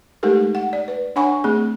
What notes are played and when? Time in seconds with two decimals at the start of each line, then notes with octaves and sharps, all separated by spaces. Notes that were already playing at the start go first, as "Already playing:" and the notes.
0.23 G#3 A3 D#4 G4 A4 A#4
0.55 F#5
0.73 D5
0.88 B4
1.16 D4 C#5 F#5 G#5 B5 C#6
1.44 A3 C4 G#4